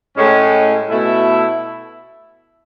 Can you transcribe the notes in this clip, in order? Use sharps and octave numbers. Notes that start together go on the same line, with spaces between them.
A2 G#3 C#4
B2 A3 E4